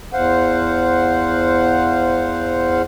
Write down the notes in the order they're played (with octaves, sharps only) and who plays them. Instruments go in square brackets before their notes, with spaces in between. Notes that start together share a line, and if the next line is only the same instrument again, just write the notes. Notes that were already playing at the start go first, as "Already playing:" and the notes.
[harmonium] E2 C5 F5 F#5